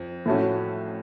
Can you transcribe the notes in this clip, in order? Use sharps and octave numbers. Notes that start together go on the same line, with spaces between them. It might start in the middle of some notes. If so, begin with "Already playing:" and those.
Already playing: F2 F3
A2 A3 C#4 F#4